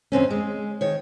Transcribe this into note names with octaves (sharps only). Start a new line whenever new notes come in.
F2 D3 C4 C#4
G#3
D#3 C#5